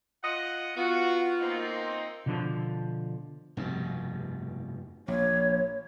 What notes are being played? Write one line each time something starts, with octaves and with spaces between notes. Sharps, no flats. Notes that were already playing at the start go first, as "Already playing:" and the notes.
F4 D#5 F#5
B3 F4 F#4
A#3 C4 D#4
B2 D3 F3
F1 G2 B2
A#1 C#5